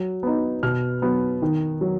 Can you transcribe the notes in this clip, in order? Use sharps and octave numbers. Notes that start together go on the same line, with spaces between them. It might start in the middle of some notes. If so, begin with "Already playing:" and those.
Already playing: F#3
B3 D#4
B2 F6
F#3 B3
D#3
F#3